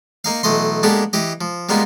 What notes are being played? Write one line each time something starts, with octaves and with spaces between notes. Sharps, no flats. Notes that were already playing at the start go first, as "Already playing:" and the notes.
A#3 D#4 F5
B1 E3 A3 D#5 C6
G#3 A#3 B3 D4 G4 A4
E3 G4 D#5
F3
G3 G#3 A#3 B3 D#4 F4